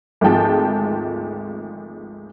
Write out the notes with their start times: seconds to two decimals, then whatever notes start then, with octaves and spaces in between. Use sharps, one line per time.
0.21 G#1 D2 F3 G#3 G5 A5